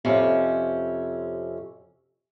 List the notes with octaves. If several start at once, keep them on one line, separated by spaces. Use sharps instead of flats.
F2 C3 C#4